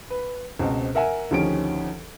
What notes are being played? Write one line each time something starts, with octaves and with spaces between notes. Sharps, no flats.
B4
C#2 B2 C4 C5
A#4 E5 F#5 G#5
D2 D#3 F3 C#4 G4 D7